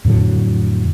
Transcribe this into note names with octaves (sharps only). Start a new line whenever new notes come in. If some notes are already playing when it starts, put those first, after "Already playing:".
F2 A2 D3 F#3